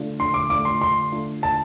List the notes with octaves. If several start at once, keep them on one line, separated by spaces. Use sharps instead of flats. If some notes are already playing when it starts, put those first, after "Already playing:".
Already playing: D3 A3 D4 F4
D3 C6
D6
A3 D4 F4 D6
C6
D3 C6
A3 D4 F4
D3 A5